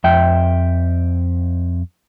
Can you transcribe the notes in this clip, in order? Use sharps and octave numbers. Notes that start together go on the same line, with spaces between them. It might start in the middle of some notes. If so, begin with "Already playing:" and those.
F2 E5 G5